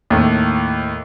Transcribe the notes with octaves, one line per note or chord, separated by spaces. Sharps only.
D#2 A2